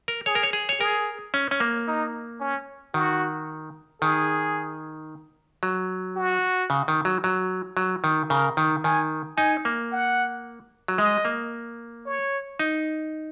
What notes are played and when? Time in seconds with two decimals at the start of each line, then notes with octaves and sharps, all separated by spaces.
0.08 A#4
0.26 G#4 C#5
0.35 A#4
0.43 C#5
0.53 G#4
0.69 C#5
0.80 G#4 A#4
1.34 C#4
1.51 C#4
1.60 A#3
1.88 D#4
2.40 C#4
2.94 D#3 F#4
4.01 D#3 G#4
5.63 F#3
6.16 F#4
6.70 C#3
6.88 D#3
7.05 F#3
7.24 F#3
7.77 F#3
8.04 D#3
8.30 C#3 A#4
8.57 D#3
8.84 D#3 G#5
9.37 D#4 G#5
9.65 A#3
9.92 F#5
10.88 F#3
10.98 G#3 D#5
11.25 A#3
12.06 C#5
12.59 D#4